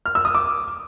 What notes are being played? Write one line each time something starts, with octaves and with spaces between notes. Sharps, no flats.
F6
E6
D#6
D6